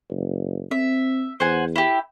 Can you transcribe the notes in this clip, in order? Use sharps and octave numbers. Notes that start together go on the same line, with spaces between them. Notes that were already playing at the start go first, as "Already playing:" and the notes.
F#1
C4 E5
E2 C5 F#5 G#5
E4 G4